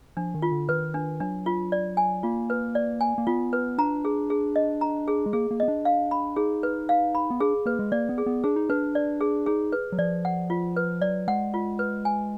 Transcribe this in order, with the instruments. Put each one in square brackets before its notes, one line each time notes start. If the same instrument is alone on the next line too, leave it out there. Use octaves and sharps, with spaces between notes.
[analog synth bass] F3 [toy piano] D4
[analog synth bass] D#3
[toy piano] F4
[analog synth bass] D3
[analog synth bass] D#3 [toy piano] B4
[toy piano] D4
[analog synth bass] F#3 [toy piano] D4
[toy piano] F4
D5
G#5
[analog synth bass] A#3 [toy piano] F4
[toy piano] B4
D5
G#5
[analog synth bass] A#3
[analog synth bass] B3 [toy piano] F4
[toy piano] B4
[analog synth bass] D4 [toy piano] A#5
[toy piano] G#4
G#4
D#5
A#5
G#4
[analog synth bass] G#3
[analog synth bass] A#3 [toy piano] G#4
[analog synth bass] A#3
[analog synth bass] B3 [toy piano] D#5
[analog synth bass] D4
[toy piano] F5
B5
[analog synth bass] D#4 [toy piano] G#4
[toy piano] B4
F5
B5
[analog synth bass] B3
[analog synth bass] D4 [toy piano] G#4
[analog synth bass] A#3 [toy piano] B4
[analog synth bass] G#3
[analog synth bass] A#3 [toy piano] D5
[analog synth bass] B3
[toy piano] G#4
[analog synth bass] B3
[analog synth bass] D4 [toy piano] G#4
[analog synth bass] D#4
[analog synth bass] D4 [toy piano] B4
[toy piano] D5
G#4
[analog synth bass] D#4 [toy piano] G#4
[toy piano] B4
[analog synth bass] F#3
[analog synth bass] F3 [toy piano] D5
[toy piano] F#5
F4
B4
[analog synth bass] F#3 [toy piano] D5
[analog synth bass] G#3 [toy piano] F#5
[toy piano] F4
B4
G#5